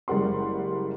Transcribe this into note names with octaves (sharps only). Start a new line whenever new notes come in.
F#1 G3 G#3 A#4 F#5 C6